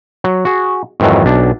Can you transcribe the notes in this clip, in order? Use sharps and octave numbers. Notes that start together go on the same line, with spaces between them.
F#3
F#4 G#4
F2 G#2 D#3 E3 F#3
B1 D4